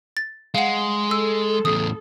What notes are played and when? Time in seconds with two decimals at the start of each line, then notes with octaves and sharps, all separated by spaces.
0.17 A6
0.55 G#3 F5 F#5
1.11 A4 E6
1.65 E2 A2 D#6